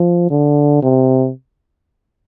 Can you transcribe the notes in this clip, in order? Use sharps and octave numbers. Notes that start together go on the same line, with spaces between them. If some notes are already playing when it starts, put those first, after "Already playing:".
Already playing: F3
D3
C3